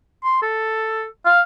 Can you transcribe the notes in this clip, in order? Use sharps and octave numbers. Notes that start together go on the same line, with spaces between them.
C6
A4
F5